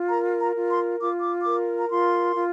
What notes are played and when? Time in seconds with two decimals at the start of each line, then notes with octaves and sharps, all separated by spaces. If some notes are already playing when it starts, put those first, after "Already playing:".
Already playing: F4
0.09 A#4 A#5
0.39 A#5
0.55 F4
0.70 C6
1.00 F4 D6
1.21 D6
1.42 A#4 D6
1.80 A#5
1.90 F4 C6
2.36 F4